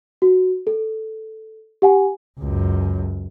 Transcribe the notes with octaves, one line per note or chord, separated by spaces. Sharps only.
F#4
A4
G4 F#5 G#5
C#2 F#2